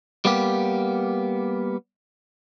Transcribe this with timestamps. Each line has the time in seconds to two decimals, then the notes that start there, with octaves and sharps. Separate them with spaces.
0.25 G3 A#3 B3 G4